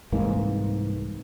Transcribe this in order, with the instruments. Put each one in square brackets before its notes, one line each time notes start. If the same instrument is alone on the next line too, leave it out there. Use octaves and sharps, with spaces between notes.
[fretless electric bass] C2 G#2 E3 A#3